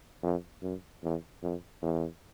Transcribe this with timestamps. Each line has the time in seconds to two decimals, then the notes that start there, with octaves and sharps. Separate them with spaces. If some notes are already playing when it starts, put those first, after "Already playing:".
0.23 F2
0.62 F#2
1.03 E2
1.43 F2
1.82 E2